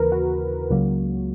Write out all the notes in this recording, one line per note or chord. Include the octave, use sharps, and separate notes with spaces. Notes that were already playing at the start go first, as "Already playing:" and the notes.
Already playing: D#2 C#3 E3 A#4 B4
F#4
C#2 C#3 F#3 A#3